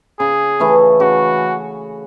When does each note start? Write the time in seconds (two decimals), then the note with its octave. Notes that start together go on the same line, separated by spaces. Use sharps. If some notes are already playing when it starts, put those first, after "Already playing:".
0.19 C#3 G#4
0.60 E3 A3 C#4
1.00 C#3 F#4